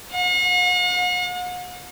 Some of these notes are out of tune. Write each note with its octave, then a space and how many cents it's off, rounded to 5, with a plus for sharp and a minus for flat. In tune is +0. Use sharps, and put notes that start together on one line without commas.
F#5 -45